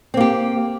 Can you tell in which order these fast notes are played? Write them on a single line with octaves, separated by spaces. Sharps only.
C4 A#3 G4